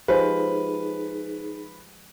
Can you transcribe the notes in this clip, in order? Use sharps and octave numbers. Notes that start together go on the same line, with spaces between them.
F3 G#3 D#4 G4 G#4 B4 C5